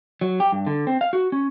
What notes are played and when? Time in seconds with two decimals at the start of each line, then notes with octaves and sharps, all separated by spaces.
0.21 F#3
0.40 G4
0.52 G2
0.67 D3
0.87 C4
1.01 F5
1.13 F#4
1.32 C#4